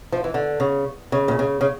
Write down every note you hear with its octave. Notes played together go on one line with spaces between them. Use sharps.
F3
E3
D3
C#3
C#3
A#2
C#3
C#3